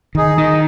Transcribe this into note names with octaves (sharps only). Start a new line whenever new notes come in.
D#3 D#4 G#4
D#3 D#4